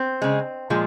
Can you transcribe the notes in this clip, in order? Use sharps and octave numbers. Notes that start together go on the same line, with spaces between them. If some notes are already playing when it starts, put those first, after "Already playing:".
Already playing: C4
C#3 G#3
A#2 F3 G#3